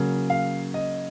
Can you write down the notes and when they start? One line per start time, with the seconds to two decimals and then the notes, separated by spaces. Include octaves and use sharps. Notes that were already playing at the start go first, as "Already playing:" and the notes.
Already playing: C#3 F#3 A#3
0.30 F5
0.74 D#5